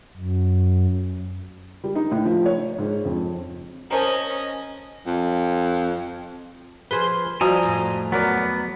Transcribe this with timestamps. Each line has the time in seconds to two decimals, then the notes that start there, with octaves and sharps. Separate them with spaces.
0.17 F#2
1.84 G3
1.95 D#4
2.12 A2
2.25 F3
2.46 C#5
2.79 G#2
3.05 F2
3.91 C#4 A#4 C5 D#5 A5
5.06 F2
6.91 F3 G#4 B4 C5 G#5 G7
7.41 F3 G3 F#4 G#5 A#5 D#6
7.63 F2 A2
8.12 F#3 B3 A#4 D5